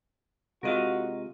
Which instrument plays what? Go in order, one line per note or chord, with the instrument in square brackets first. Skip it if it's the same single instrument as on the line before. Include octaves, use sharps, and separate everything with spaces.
[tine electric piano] C3 G#3 F4 [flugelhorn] F#4 [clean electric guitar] A#4 D#5 F5